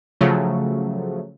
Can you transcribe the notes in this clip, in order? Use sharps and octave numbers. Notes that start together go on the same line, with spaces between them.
C#3 F3 F#3 A3